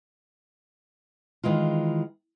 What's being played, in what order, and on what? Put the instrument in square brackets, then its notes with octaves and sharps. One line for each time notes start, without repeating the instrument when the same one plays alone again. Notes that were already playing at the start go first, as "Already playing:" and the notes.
[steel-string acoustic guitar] D#3 E3 G#3 F4